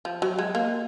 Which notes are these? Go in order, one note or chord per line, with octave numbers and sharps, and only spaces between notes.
F3
F#3
G#3
A#3